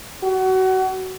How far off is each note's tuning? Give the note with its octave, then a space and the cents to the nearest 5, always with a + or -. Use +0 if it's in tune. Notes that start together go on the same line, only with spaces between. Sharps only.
F#4 +25